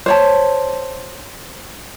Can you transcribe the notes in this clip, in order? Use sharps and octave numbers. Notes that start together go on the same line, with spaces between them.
C5 C#5 A5